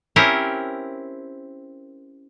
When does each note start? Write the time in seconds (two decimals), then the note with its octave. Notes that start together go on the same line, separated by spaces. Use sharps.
0.16 C4 C#4 E4 G4 A#4